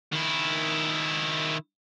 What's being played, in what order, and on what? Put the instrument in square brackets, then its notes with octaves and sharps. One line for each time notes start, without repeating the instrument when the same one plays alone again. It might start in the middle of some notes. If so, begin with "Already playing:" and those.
[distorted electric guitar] D#3 E4